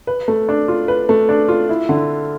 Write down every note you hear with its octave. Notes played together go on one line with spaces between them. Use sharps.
B4
A3
D4
F4
B4
A3
D4
F4
E4
D3